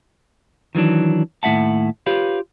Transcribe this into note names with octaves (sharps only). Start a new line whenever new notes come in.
D#3 E3 F#3 D4
D#2 A2 D4 E5 F#5 A5
F4 G4 B4 C#5 F5